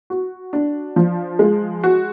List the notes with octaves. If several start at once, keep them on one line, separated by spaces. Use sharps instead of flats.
F#4
D4
F3
G#3
F#4